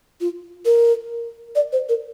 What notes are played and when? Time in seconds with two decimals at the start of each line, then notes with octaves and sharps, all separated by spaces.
0.21 F4
0.65 A#4
1.56 D5
1.73 C5
1.89 A#4